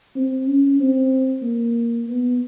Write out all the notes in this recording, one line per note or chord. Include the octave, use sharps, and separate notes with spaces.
C4
C#4
C4
A#3
B3